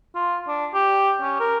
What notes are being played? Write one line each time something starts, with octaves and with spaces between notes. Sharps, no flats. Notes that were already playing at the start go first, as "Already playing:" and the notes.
F4
D4
G4
C#4
A#4